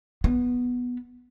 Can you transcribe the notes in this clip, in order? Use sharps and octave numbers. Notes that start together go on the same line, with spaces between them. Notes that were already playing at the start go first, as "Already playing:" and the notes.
B3